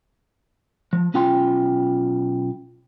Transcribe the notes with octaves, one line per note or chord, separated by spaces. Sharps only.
F3
B1 C#4 F4 G5 G#5 C6